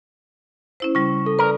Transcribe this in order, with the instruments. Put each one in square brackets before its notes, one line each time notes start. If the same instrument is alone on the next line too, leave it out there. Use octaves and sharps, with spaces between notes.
[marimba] C#4 E4 C5
[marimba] C#3 G3 [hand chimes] C#6
[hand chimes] A4
[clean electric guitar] A#4 [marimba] B4 D5